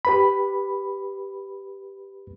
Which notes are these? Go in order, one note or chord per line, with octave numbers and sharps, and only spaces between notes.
G4 B4 B5